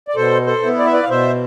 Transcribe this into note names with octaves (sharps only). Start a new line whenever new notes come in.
D5
B2 A4 C5
A4 C5
B3 E4
D5
E5
B4 D5
F5
B2 C5 E5